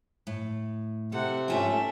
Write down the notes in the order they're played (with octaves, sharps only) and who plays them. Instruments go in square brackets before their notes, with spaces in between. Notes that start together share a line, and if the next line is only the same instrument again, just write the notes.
[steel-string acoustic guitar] A2
[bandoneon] C3 [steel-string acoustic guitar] A4 [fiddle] F#5
[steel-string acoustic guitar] G#2 F4 G5 [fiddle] A3 E5 [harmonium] C#4